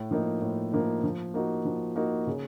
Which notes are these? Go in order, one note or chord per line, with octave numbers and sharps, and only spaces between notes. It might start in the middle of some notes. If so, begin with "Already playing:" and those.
Already playing: A2
F3 A#3 D#4
A2
F3 A#3 D#4
F3
A#3 D#4 F#4
F3
A#3 D#4 F#4
C#3